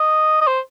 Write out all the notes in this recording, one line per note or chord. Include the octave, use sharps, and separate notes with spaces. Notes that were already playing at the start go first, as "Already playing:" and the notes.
Already playing: D#5
D#5
C5